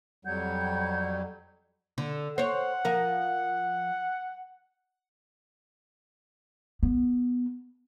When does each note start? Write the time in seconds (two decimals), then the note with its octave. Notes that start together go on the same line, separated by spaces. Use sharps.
0.25 F2 F#3 G3 F#5 G6 G#6
1.98 D3
2.38 C5 C#5 F#5
2.85 F3 A#4
6.83 B3